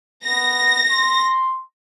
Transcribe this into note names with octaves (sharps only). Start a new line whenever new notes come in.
B3 A#6
C6